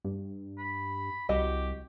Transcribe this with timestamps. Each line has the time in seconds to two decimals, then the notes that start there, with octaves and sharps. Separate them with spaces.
0.05 G2
0.58 B5
1.29 C2 F#4 G4 D#5